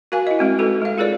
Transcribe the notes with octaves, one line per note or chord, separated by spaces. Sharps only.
F#4 A#4 F5 G#5
E4 D#5
G#3 C4 F#4
D#4 F#4 A4 B4
G#3 F5
F4 G#4 A#4 C#5 D5